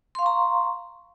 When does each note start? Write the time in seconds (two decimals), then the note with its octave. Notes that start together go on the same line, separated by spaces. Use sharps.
0.15 C6
0.19 F5
0.22 C#6
0.26 A#5